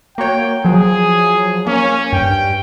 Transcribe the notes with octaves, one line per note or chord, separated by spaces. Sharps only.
A#3 F#4 C#5 G5
F3 F#3 G#4
A#3 C#4
G2 G5